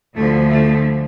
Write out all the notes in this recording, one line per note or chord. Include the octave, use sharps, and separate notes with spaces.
D2 D3 F3 A3
A3